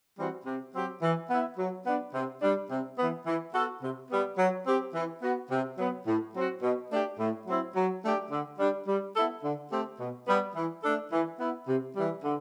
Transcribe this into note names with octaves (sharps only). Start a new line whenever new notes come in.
E3 G3 C4 F#4
C3
F#3 C4 G4
E3
B3 E4
F#3
B3 D4
C3
G3 D4
C3
E3 B3
E3
B3 F#4 A4
C3
G3 B3
F#3
C4 G4
E3
B3 F#4
C3
F#3 B3
A2
F#3 C4 F#4
B2
A3 D4 G4
A2
F#3 C4 E4
F#3
A3 D4 G4
D3
G3 D4
G3
B3 E4 A4
D3
A3 C4 G4
B2
G3 B3
E3
A3 D4 A4
E3
B3 E4
C3
E3 G3
D3